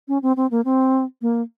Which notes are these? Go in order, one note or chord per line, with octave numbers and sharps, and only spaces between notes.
C#4
C4
C4
A#3
C4
A#3